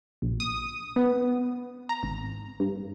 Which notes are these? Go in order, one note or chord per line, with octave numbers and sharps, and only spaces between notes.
A#1
D#6
B3
A#5
G#1
G2